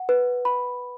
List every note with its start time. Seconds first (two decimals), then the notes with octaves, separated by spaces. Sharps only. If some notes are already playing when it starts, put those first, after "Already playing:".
Already playing: F#5
0.09 B4
0.45 B5